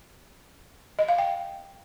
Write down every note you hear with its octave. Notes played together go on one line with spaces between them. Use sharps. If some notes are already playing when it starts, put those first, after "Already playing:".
D#5
F5
G5